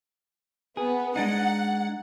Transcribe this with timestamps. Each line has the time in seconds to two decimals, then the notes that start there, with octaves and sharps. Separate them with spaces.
0.77 B3 G#4
1.16 G#3 D4 D#4 F#5